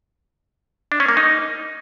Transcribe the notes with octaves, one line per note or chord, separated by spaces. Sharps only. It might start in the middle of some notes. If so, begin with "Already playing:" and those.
D4
C#4
A#3
D#4